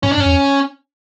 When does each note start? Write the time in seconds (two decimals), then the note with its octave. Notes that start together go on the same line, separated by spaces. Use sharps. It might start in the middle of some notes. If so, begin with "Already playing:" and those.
0.03 G#2 C#4
0.12 D4
0.17 G2
0.20 C#4
0.25 F2
0.30 E2